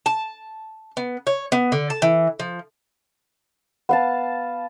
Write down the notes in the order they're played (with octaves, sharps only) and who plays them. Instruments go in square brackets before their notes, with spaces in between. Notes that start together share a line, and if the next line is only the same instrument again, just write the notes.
[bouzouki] A5
B3
C#5
B3
D3
A5
E3
F3
[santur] B3 F5 A5